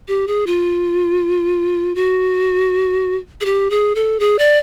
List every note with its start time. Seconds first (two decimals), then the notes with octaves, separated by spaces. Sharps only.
0.08 G4
0.27 G#4
0.47 F4
1.95 F#4
3.41 G#4
3.45 G4
3.70 G#4
3.95 A4
4.20 G#4
4.39 D5